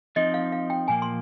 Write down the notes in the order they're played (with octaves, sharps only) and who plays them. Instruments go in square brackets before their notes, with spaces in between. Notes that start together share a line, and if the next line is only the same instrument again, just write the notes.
[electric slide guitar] F3 C4 D#4 [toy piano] D#5
[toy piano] F5
F5
G5
[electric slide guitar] A#2 F3 A#3 [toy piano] G#5
[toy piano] C6